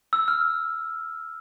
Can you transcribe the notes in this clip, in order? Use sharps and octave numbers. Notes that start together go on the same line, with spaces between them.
E6
F6